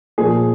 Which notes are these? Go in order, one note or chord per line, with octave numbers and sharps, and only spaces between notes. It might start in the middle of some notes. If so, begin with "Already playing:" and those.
A#2 F3 G#4